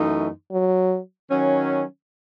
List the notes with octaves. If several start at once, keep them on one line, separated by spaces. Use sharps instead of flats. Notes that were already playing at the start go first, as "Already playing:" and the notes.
Already playing: F#2 E3 A3 D#4
F#3
D#3 F#3 C#4